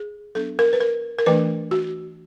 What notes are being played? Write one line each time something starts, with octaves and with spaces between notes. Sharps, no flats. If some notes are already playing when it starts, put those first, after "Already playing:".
Already playing: G#4
F#3 B3 D4 A4
A#4
B4
A#4
A#4
E3 A3 D4 B4
F#4